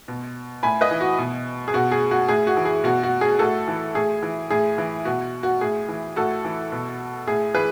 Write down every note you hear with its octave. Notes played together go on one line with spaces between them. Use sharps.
B2
A2 G#5 B5
B4 D#5
E3
F#4
B2
G#4
B2 F#4
G#4
F#4
A2 G#4
F#4
E3
G#4
B2 F#4
F#4
G#4
A2 F#4 A4
E3
A2 G#4
E3
A2 G#4
E3
B2 F#4
F#4
A2 G#4
E3
A2 F#4 A4
E3
B2
A2 G#4
E3 G#4 B4